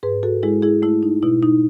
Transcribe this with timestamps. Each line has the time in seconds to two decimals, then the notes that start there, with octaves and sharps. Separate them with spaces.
0.03 G#2 G#4 B4
0.23 F#4 A4
0.43 G#3 E4 G#4
0.62 E4 G#4
0.82 A3 E4
1.03 D#4
1.23 B2 E4
1.42 D#4